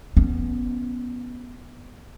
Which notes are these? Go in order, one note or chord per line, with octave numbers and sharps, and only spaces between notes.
B3 C#4